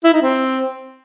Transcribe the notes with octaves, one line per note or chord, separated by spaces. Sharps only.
E4
D#4
C4